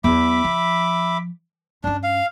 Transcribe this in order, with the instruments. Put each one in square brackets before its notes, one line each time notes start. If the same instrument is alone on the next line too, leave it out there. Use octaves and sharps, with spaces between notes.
[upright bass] E2 F#3 [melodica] E5 B5 D6
[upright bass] F3
[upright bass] G2 C#4 [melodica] D4
[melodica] F5